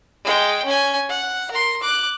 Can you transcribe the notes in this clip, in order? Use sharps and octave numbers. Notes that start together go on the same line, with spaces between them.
G#3 G5
C#4 G#5
F#5
A#4 C6
D6 F#6